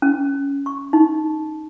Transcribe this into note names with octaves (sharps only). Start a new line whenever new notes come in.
C#4
C#6
D#4